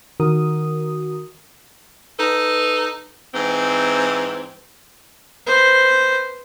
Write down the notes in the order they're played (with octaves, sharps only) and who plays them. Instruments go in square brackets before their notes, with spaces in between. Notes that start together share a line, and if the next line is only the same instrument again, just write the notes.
[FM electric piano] D#3 F#4 A#4 D#6
[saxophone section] D#4 A4 B4
G#2 E3 C4
[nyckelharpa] B4 C5